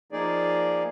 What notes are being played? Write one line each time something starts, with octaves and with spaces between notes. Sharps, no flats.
F3 A#3 D#4 G#4 D5